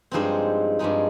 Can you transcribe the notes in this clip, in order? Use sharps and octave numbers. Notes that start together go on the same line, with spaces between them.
G2 F3 G#3 C4 D#4 C5
G2 F3 G#3 D#4